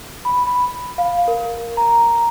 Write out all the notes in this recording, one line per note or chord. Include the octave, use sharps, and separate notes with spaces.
B5
B5
F5
A#4
A#5